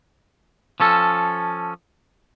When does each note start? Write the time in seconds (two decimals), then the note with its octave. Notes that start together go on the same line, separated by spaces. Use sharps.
0.80 F3 C#4 A4